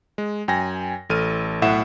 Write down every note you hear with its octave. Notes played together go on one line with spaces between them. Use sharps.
G#3
F#2 G5 G#5 A#6
A1 A4 F6 D#7
B1 A2 E5 F#5 E7